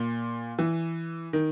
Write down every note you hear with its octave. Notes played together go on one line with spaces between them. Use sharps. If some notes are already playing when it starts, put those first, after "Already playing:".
Already playing: A#2
E3
D#3